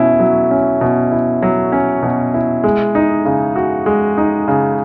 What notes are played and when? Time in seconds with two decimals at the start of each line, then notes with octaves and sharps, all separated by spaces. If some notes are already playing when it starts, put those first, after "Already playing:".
Already playing: B2 C#4 E4
0.20 F#3
0.51 C#4
0.81 B2
1.11 E4
1.42 F#3
1.72 C#4
2.02 B2
2.34 E4
2.64 G#3
2.95 D#4
3.25 C#3
3.56 F#4
3.86 G#3
4.17 D#4
4.48 C#3